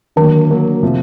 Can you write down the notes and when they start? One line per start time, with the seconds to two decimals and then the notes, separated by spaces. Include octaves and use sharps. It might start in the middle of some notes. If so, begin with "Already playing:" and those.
0.16 D3 D#3 F#3 A#3
0.50 D3 F#3 A#3
0.83 C3 F3